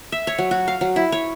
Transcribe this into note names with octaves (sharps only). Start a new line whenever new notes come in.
E5
C#5
F#3
F#4
F5
F#3
E4
C#5